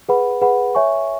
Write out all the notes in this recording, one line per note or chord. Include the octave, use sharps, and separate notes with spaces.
G#4 B4 F#5 B5
G#4 B4 F#5 B5
C#5 E5 G#5 C#6